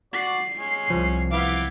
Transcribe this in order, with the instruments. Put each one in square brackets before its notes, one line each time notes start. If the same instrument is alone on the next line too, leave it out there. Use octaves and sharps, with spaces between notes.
[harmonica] F#4 D5 [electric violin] C7
[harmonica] G#3 C#4
[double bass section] C2 [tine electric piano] F3
[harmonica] E3 B3 F5 [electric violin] D6